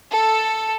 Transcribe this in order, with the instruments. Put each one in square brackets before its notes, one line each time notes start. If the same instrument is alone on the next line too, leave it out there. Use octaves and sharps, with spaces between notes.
[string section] A4